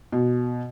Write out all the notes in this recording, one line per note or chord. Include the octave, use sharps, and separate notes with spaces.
B2